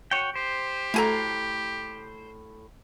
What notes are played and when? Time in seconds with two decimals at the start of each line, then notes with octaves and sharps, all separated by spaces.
0.11 F#4 C#5 G5
0.36 G4 C5
0.94 A2 A3 F#4 A4 G#5 A#5